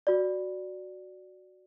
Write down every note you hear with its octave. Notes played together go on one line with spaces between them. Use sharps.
F#4 D5